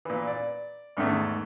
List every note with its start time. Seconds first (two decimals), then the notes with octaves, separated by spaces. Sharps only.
0.05 A#2 E3
0.27 D5
0.97 E2 G#2 D#3 A3